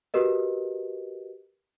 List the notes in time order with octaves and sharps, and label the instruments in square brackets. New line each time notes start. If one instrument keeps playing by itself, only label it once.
[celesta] F#4 G4 A#4 B4 D#5